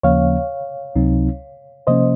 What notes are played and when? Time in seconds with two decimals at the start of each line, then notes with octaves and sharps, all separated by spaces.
0.03 D#2 C#3 F3 A#3 C#4 C#5 F5
0.96 C#2 C3 F#3 C4 D#4
1.87 C3 F3 A#3 C#4 C5 D#5